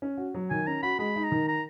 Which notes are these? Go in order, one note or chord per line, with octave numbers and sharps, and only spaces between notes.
C#4
F#4
F#3
D#3 G#5
C#4 A#5
F#4 B5
G#3 B5
D#4
A#5
D#3
A#5